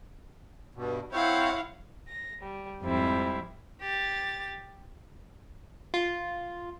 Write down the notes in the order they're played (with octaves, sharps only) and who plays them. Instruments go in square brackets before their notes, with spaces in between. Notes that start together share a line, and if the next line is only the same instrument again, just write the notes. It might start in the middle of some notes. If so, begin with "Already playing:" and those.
[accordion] G2 B2
[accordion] C4 C5 C#5 [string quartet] E4 F5 F#5
[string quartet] A#6
G3
F2 G#2 G3 C4 E4
[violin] G4 A6
[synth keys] F4